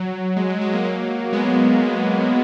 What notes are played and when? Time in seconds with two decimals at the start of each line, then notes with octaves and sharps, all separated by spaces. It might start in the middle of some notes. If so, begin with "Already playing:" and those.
Already playing: F#3
0.36 G#3
0.49 F#3
0.61 G#3
0.72 F#3 A#3
0.84 F#3 A#3
1.33 G#3 B3